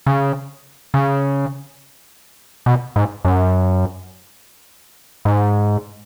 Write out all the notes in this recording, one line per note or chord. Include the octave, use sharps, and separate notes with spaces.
C#3
C#3
B2
G#2
F#2
G#2